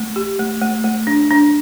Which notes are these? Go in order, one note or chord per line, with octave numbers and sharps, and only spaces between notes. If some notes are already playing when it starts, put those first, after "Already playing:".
Already playing: A3
G4
A3
A3
A3
D4
D4